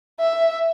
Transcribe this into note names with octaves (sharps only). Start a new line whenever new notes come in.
E5